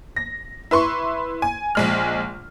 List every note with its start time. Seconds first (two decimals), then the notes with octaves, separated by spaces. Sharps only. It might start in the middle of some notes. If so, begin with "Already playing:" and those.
0.16 A#6
0.71 E4 B4 C6 C#6
1.42 G#5
1.75 A#1 G#3 F6